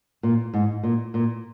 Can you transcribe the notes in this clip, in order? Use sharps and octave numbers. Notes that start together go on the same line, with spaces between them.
A#2
G#2
A#2
A#2